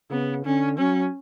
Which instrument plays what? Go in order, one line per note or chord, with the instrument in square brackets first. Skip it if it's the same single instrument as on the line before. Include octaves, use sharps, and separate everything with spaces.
[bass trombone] C#3 [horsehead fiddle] B3
[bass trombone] D3 [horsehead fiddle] C#4
[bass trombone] F#3 [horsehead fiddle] C#4